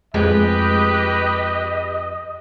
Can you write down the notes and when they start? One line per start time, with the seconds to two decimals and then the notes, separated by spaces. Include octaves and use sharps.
0.14 F2 G#3 G4 B4 D#5